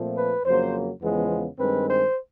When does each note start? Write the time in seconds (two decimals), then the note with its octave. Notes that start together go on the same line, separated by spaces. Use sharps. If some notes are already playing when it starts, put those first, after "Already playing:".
Already playing: A#2 F3 A3 C4
0.17 B4
0.45 F2 C#3 F#3 A#3 C5
1.02 E2 C#3 F3 G#3 B3
1.59 G2 D#3 G#3 C4 B4
1.88 C5